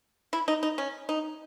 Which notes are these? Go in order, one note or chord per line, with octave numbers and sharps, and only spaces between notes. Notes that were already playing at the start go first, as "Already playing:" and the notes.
E4
D#4
D#4
C#4
D#4